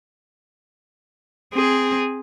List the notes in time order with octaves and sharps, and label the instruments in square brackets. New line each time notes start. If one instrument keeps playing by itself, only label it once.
[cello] C4 G#4